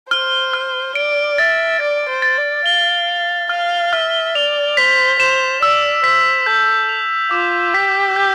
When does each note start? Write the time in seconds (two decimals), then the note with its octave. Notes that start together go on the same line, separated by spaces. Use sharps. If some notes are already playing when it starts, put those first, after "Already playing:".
0.11 C5 F6
0.53 F6
0.95 D5 D7
1.38 E5 A6
1.80 D5 A6
2.09 C5
2.22 A6
2.37 D5
2.65 F5 G7
3.08 D7
3.49 F5 F6
3.92 E5 F6
4.35 D5 F7
4.77 C5 B6
5.19 C5 E7
5.62 D5 E6
6.04 C5 B6
6.46 A4 G6
6.89 F7
7.31 F4 D6
7.74 G4 B6
8.16 G6